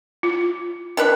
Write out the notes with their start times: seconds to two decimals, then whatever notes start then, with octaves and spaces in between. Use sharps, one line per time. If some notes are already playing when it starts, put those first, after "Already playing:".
0.23 F4
0.97 D#3 D4 B4